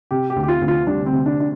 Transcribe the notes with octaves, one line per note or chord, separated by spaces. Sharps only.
C3 G4
G4
D2
G4
F4
D2
F4
G3 D4
C4
C3
D4
D4